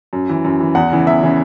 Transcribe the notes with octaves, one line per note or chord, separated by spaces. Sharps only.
F#2
E3
F#2
E3
E2 F#5
C#3 E3
E2 E5
C#3 E3